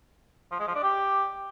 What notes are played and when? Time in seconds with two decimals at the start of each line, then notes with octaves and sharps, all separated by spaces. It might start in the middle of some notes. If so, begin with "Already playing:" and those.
0.52 F3
0.60 G#3
0.67 F3
0.75 D4
0.83 G4